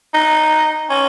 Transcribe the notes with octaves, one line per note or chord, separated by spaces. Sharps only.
D#4
C#4